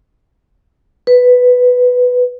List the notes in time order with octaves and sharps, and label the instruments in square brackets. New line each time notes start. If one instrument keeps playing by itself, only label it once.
[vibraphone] B4